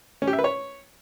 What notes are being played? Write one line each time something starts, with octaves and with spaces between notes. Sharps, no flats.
C#4
G4
E5
B4
C#5